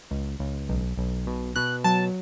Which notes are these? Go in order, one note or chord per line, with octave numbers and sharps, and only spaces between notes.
C#2
C#2
B1
B1
B2
B2 F#6
F#3 A5